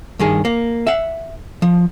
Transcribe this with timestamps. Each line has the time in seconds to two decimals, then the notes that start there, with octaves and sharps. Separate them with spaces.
0.19 G2 D#3 G#4
0.45 A#3
0.87 E5 F#5
1.62 F3